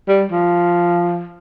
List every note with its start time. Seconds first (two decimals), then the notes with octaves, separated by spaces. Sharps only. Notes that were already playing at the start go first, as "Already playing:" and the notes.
0.08 G3
0.31 F3